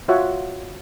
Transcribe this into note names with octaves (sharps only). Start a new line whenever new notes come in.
F4 F#4 C#5 E5 F#5